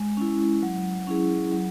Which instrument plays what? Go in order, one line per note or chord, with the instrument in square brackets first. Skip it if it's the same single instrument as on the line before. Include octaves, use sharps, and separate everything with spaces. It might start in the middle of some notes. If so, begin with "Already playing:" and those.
Already playing: [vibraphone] G#3
C#4 E4
F#3
C#4 E4 G#4
F#3